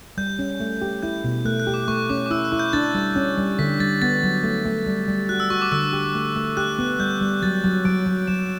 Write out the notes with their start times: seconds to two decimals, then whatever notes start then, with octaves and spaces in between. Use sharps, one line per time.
0.18 G3 G6
0.39 C#4
0.60 A3
0.82 G4
1.03 E4 G6
1.24 B2
1.45 A3 F#6
1.60 F#6
1.67 G4
1.74 D6
1.88 A3 C#6
2.09 C#4 D6
2.26 D6
2.31 E4 E6
2.45 F#6
2.52 E4
2.59 G6
2.73 D4 A6
2.95 G3
3.16 C#4
3.38 G3
3.59 D3 B6
3.80 G3 A6
4.02 B3 A6
4.23 F#3
4.44 A3
4.65 A3
4.86 G3
5.08 G3
5.29 F#4 F#6
5.40 E6
5.50 F#4 C#6
5.62 D6
5.72 D3 E6
5.93 G4
6.15 A3
6.36 A3
6.57 G4 F#6
6.79 B3
6.99 G3 G6
7.21 G3
7.42 F#3 A6
7.64 F#3
7.85 F#3 D7
8.06 F#3
8.27 F#3 E7